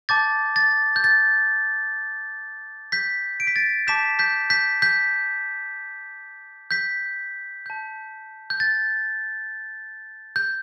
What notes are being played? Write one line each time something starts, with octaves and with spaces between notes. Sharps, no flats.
A5 D6 G6 A6
A6
G6
A6
G6 B6
D7
B6
A6 D7
A5 D6 G6 B6 E7
G6 B6
G6 B6
G6 B6
G6 B6
A5 G6
G6
A6
G6